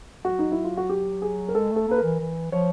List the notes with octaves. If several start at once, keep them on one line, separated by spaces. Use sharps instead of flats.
F#3 F#4
D#4
E4
F4
F#4
G4
G#4
A#4
G#3 A4
A3
A4
A#3 B4
E3 A#4
E3
F3 C#5